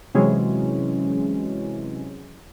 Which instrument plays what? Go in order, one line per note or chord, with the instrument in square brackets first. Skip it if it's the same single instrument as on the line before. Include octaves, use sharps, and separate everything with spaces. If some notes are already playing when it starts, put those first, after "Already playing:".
[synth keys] C3 E3 F#3 G#3 C#4